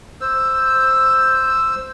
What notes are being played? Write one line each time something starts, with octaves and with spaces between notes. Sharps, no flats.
C5 E6